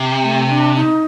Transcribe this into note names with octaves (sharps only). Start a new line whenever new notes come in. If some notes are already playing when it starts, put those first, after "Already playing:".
Already playing: C3
A3
D4
D#4